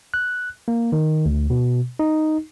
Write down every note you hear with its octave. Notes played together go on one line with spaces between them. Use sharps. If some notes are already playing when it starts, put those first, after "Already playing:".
F#6
A#3
D#3
D2
B2
D#4